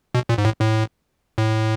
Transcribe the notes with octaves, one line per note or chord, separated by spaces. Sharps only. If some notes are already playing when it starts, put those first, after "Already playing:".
B2
A#2
G#2
A2
A2
A2